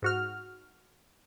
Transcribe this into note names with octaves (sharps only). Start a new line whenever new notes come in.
G#2 F#4 F6